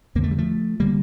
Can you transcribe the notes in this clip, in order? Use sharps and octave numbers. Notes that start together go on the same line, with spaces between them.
F2 D3 A#3
A3
G3
F3 A3
D3 G3 A#3